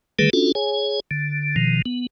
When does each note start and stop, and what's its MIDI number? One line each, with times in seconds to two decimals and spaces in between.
0.19 0.30 50
0.19 0.30 51
0.19 0.30 55
0.19 0.30 57
0.19 0.30 68
0.19 0.30 71
0.33 0.52 61
0.33 0.52 62
0.33 0.52 65
0.33 0.52 66
0.33 0.52 69
0.55 1.00 68
0.55 1.00 73
0.55 1.00 80
1.11 1.55 50
1.56 1.82 47
1.56 1.82 51
1.56 1.82 53
1.86 2.07 59